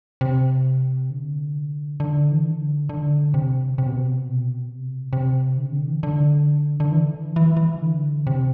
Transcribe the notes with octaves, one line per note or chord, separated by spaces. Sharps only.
C3
D3
D3
E3
D3
D3
C3
C3
B2
C3
B2
C3
C3
D3
C3
D3
E3
D3
D3
E3
E3
E3
D3
C3